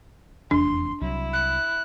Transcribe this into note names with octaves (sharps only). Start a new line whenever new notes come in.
F1 E2 D4 C6
C2 F#3 E4
F#6